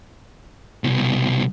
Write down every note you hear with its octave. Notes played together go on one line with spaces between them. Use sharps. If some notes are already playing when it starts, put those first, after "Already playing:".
C2 B2